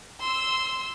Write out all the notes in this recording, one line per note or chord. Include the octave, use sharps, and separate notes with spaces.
C6 E6